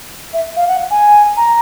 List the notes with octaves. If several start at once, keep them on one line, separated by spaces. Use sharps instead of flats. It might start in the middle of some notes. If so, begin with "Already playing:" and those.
E5
F5
F#5
G#5
A#5